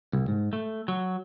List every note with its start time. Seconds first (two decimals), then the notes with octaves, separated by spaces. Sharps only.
0.13 C2
0.28 G#2
0.53 A3
0.88 F#3